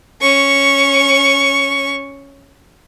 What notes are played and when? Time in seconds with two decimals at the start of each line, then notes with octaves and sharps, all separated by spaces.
0.21 C#4 C#6